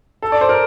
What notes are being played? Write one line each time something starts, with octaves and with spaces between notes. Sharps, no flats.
A4
D5
C5
A#4